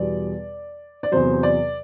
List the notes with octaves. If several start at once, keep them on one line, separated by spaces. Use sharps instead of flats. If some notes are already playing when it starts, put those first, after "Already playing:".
Already playing: E2 B2 G3 D5
D5
E2 C3 F#3 C5
D5